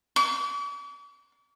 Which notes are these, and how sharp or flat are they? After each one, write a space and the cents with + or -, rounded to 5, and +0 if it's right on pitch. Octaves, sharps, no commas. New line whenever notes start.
D6 -45